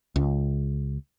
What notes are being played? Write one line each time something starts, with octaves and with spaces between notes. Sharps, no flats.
C#2